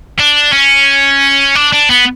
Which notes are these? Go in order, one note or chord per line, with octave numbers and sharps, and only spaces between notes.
D4
C#4
D4
D4
B3